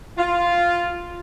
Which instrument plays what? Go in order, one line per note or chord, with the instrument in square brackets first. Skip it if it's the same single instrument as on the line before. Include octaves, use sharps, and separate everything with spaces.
[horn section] F4